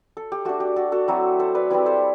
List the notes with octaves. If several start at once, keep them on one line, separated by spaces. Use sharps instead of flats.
A4
G4
A3 D4 F#4
G4
F#4 A4
F#4 A4
F#3 A3 C4 E4
A4 C5
B4 D5
G3 C4 E4 G4 B4
A4 C5